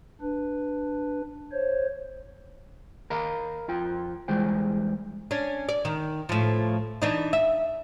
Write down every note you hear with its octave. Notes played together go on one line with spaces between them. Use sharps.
D4 B4
C5 C#5
A#4 D#5 F5 A#5 B5
F2 F4 G5
E2 E3 G3 G#3 C5 G5
C#4 D4
D5
D#3
A2 F3
E3 D4 D#4
E5